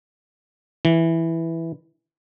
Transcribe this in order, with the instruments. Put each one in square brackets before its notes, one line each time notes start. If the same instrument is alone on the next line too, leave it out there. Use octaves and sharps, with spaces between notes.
[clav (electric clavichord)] E3